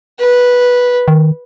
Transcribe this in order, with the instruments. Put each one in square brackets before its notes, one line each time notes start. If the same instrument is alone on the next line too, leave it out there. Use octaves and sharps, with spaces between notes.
[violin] B4
[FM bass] D#3